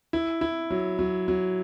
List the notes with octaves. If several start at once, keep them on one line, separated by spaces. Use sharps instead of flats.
E4
E4
F#3
F#3
F#3